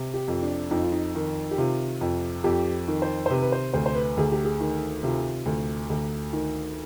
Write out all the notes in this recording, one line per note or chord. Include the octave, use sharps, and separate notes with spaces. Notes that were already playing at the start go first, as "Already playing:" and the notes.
Already playing: C3
G4
F2
D4
F2 D#4
F4
D#4
D#3
G4
C3 F4
F2
F2 G4
D#3
C5
C5
C3 B4
B4
C5
D2 C5
C5
B4
D2 G#4
G4
G#4
D#3
C3 F4
D2
D2
D#3